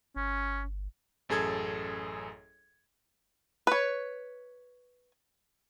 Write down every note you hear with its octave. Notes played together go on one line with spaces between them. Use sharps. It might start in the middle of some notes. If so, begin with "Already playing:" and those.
G1 C#4
A1 F#2 G#4 A4 G#6
B4 C#5